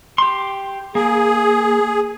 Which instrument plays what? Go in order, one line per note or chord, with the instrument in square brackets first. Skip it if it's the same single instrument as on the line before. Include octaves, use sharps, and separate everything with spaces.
[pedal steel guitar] G4 C6
[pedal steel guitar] A#3 [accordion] G#4